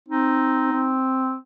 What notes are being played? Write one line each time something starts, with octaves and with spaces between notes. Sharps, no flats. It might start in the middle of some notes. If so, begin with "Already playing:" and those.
C4 D#4
C4